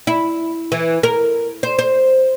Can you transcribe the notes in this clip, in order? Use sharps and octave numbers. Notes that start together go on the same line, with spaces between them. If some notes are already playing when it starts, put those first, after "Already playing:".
E4
E3
A#4
C5
C5